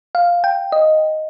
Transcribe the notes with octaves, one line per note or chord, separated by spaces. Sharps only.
F5
G5
D#5